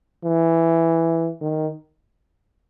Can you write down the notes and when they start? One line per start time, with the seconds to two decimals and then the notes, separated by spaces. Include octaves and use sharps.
0.24 E3
1.41 D#3